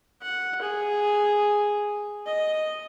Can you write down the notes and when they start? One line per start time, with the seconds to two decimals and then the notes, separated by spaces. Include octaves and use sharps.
0.22 F#5
0.62 G#4
2.26 D#5